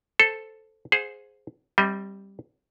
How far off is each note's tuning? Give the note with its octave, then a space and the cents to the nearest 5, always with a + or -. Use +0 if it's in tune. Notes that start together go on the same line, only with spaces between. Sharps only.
A4 +0 C5 +0
G#4 +5 C5 +0 F#5 -45
G3 +0 C4 +25 D#5 +45